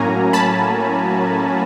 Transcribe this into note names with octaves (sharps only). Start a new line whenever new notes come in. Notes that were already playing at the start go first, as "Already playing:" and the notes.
Already playing: A2 F#3 A#3 C#4 G#5 A#5
A5 B5